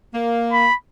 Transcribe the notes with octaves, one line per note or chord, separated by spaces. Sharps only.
A#3
B5